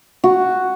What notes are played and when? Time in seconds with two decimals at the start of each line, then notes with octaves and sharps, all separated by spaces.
0.24 F#4